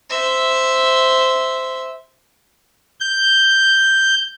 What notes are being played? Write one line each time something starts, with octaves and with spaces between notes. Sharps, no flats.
C5 E5
G6